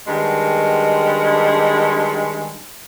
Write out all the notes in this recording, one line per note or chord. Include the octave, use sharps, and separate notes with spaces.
G2 D#3 G#3